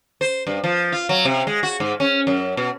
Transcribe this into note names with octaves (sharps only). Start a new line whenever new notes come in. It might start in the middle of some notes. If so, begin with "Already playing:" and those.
C5
G2
F3
F4
F#3
C3
G#3
F#4
G#2
C#4
F#2
B2